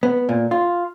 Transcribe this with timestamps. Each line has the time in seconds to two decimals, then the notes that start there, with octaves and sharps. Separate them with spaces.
0.03 B3
0.29 A#2
0.51 F4